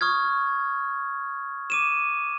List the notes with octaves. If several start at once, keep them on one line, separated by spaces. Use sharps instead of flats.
C#6 D#6 F6 G#6
D6 D#7 E7